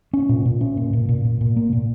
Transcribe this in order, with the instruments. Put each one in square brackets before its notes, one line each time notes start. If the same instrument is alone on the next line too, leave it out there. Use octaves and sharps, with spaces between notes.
[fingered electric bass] C#4
A#2
A#2
C#4
A#2
A#2
A#2
A#2
A#2
A#3
A#2